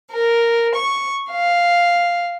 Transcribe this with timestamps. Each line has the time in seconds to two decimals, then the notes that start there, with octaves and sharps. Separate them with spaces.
0.12 A#4
0.75 C#6
1.32 F5